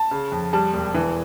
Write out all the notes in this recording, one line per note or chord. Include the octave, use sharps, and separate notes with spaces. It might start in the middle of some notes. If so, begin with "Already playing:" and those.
Already playing: A5
C#3
F2
G3 A5
E1
E3